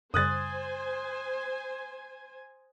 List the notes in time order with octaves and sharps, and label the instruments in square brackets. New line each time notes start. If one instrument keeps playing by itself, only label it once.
[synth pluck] F#2 C#3 G3 [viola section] C5 G#5 [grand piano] D#6 F#6 A6